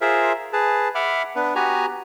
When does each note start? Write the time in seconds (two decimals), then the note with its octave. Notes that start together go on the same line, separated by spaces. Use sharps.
0.01 F4 G#4 A#4 C5 E5
0.53 G#4 B4 A5
0.95 E5 F#5 B5 D6 F6
1.36 B3 D4 B4
1.55 B3 F#4 G4 B4 G#5 A#5